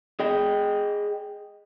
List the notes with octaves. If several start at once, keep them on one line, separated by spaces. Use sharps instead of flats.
G#4 D#5 G5